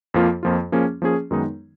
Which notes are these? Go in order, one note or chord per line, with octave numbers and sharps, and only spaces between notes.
F2 F3 A#3 F4
F2 F3 A#3 F4
F3 A#3 C#4 G#4
F3 A#3 C#4 G#4
F#2 D#3 G#3 B3 D#4